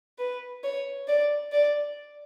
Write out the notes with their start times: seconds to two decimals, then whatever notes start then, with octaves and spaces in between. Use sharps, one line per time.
0.19 B4
0.64 C#5
1.08 D5
1.52 D5